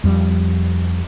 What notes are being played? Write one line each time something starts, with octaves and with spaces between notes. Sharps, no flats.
F2 G3